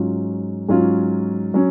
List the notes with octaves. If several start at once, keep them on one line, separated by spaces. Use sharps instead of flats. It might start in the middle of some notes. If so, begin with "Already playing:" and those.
Already playing: G#2 F#3 C#4 F4
G#2 F#3 C#4 F4
F#3 C#4